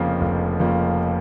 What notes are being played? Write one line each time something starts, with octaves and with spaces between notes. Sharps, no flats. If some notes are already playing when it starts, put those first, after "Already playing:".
Already playing: F1 F2 C#3 F3 A#3
F1
F2 C#3 F3 A#3